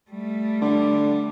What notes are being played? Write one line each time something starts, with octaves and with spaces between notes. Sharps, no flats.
G3 A3
D3